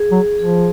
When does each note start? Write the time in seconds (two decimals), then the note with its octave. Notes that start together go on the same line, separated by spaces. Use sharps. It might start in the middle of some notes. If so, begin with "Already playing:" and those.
Already playing: G#4
0.11 F#3
0.39 F3 G#4